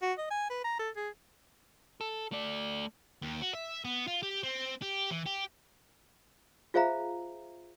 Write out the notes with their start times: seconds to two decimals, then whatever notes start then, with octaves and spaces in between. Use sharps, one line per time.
0.02 F#4
0.18 D#5
0.31 G#5
0.50 B4
0.64 A#5
0.79 A4
0.96 G#4
2.01 A4
2.32 A3 D5
3.23 D#2
3.42 F#4
3.54 E5
3.84 B3
4.08 F4
4.23 G4
4.43 C4
4.82 G4
5.11 E3
5.26 G4
6.74 F4 G#4 C5 E5 F5 A#5